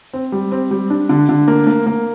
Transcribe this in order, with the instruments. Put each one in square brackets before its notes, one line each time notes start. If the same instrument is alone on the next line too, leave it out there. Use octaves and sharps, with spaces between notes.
[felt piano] C4
G3
C4
G3
D4
D3
D3
A#3
A#3
A#3